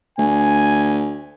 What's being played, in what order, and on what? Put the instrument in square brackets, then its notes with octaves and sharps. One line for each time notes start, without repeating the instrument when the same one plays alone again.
[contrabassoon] D2 [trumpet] G#5